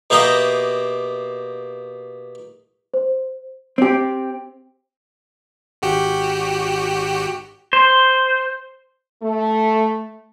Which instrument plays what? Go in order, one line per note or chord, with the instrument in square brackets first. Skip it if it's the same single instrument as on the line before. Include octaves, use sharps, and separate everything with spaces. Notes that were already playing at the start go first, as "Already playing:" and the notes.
[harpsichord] B2 A#3 G4 D#5 E5 A#5
[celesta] C5
[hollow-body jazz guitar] C4 G4
[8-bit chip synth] G#1 F#4 G4
[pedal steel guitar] C5
[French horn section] A3